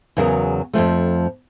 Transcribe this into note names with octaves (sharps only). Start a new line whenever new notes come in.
E2 C#3 F#3 F#4 A#4
F2 G#2 F3 A3